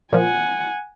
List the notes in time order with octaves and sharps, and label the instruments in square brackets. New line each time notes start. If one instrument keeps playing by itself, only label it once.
[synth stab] A#2 F3 [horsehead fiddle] F#5 G#5